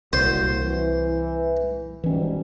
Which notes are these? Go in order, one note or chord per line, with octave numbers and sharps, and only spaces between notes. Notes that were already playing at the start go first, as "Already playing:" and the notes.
C2 F#3 A#3 F#4 C5
E3
G#2 B2 E3 G3 C#4